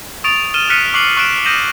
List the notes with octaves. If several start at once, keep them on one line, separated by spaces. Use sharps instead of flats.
C#6 D#6 A6 D7 F7
F6 D#7 E7 G7
D#6 F6 F#6 B6 C#7 D#7
C#6 D6 F#6 C7 F#7
C#6 F6 F#6 D7 E7
D#6 G6 A#6 D#7 E7 F#7